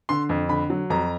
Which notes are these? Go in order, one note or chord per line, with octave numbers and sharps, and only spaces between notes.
D3 C6
F2
D3 B5
F#3
F2 A#5